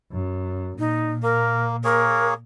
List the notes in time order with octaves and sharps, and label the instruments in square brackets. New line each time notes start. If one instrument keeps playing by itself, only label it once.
[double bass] F#2
[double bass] A#2 [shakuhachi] D#4
[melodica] A#3 [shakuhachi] A#4
[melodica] A#3 G#4 C#5 [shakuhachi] A#4